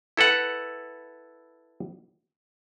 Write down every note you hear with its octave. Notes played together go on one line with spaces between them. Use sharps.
E4 A4 B4 F#5